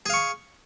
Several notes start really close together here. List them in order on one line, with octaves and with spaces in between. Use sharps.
G#4 F5 C#6